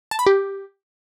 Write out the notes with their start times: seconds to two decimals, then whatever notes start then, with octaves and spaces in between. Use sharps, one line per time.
0.11 A5
0.19 B5
0.26 G4